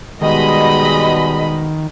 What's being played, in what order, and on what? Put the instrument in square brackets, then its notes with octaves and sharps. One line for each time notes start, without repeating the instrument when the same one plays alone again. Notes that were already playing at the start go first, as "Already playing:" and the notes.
[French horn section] B2 G3 G#3 [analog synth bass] D#3 [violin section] D#5 B5